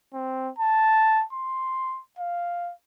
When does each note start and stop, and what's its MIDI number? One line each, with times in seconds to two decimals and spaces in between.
0.14 0.49 60
0.58 1.24 81
1.33 2.00 84
2.19 2.72 77